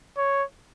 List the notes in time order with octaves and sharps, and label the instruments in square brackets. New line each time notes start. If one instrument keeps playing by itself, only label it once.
[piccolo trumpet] C#5